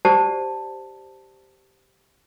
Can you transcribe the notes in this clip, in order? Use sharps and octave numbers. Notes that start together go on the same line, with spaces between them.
G4 C5 D5 A5